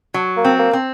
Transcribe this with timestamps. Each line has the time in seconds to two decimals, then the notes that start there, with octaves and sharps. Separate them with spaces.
0.14 F#3
0.37 A#3
0.44 C4
0.59 A#3
0.73 C4